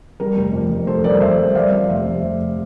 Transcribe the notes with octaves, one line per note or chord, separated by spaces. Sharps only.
G3 A#4
F1
F2
F1
F2 A4 C5
G3 A#4 D5
F2 C5 E5
G3
G3 D5 F5
F2
F1 C5 E5
F1
F1
F1